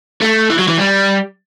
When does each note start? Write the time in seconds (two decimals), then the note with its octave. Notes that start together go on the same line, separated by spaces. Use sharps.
0.22 A3
0.50 E3
0.58 F#3
0.68 E3
0.78 G3